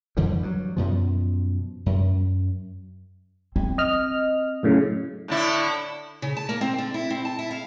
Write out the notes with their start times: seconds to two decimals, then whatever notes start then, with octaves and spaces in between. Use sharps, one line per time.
0.17 F2 D3 E3 G3
0.42 G2 F#3
0.77 F#2 B2 F3
1.86 F#2
3.56 C4
3.78 D#5 F6
4.63 F#2 A2 C#3
5.28 A2 D3 E4
6.22 C#3
6.37 A5
6.49 A#3
6.61 C4
6.79 D3
6.94 E4
7.10 C4
7.25 A5
7.39 E4
7.51 F5